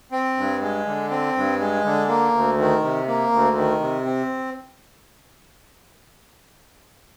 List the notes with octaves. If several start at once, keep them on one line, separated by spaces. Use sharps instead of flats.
C4
G2
G#3
D3
C4
G2
G#3
D3
A#3
D2
D#3
C3
A#3
D2
D#3
C3
C4